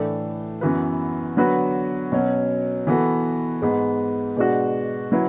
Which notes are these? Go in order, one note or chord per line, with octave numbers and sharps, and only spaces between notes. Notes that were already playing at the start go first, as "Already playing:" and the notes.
Already playing: A2 E3 A3 D4 A4
F#2 E3 B3 F#4 B4
D3 F#3 B3 F#4 B4
B2 F#3 C#4
E3 B3 F#4 A4
G#2 G#3 B3
B2 G#3 D4 F#4
F#3 C#4 E4 B4